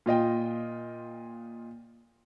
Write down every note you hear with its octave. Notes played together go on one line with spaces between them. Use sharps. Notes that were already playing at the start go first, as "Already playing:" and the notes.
A#2 F4 D#5 G5